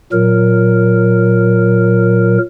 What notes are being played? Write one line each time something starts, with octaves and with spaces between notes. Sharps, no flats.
A#2 F#3 A#4